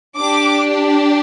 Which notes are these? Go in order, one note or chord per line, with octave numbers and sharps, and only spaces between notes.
D4 G4 D6